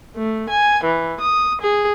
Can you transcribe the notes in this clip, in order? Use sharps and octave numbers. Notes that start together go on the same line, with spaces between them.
A3
G#5
E3
D#6
G#4